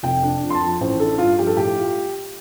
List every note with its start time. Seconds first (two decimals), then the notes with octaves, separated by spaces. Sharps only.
0.03 F1 G5
0.23 D4
0.42 F2
0.50 C6
0.55 A5
0.61 F3
0.81 A1 C5
0.99 D4 A4
1.18 G2 F4
1.37 F3 G4
1.47 A4
1.57 A2 G4
1.76 F4